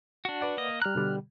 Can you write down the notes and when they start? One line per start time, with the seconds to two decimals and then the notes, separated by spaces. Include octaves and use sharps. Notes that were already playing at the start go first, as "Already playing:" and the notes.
0.25 D4 F#4
0.41 B4 D5 F#5
0.57 A#3 D#5
0.82 G3 A#5 F6 F#6
0.95 B2 D3 G3